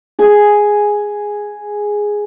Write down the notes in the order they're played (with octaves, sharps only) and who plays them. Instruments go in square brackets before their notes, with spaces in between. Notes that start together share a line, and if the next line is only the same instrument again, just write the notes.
[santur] G#4 G#5